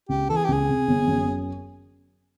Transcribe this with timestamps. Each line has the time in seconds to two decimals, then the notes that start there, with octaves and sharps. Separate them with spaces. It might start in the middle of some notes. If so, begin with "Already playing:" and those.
0.09 C#2 G4
0.29 E3 A4
0.36 G#4
0.44 G4
0.48 C#2 G#4
0.69 C3
0.87 G1
1.07 F#2